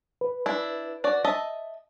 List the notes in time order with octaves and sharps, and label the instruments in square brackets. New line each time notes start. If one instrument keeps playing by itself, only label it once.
[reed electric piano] B4
[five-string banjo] D4 E4
F#4 D5
D#5 E5 A5